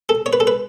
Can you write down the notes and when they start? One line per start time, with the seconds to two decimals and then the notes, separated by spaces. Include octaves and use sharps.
0.09 A4
0.26 C#5
0.33 B4
0.40 A4
0.47 B4